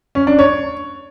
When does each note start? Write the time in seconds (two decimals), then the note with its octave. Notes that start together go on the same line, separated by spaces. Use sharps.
0.15 C#4
0.27 D4
0.39 C#5